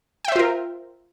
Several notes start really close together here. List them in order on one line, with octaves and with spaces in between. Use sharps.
G5 E5 C5 F4 A#4